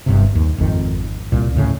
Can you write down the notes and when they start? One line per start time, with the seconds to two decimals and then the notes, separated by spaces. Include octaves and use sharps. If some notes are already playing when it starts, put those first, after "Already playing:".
0.06 G1 G2 C3
0.35 D#2
0.58 G#1 F2 D#3
1.32 C2 A#2
1.55 D2 A2 C#3